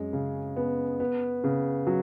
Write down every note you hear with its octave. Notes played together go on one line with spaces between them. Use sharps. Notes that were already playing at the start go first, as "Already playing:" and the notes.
Already playing: F#2 G#3
C#3
B3
B3
C#3
F#3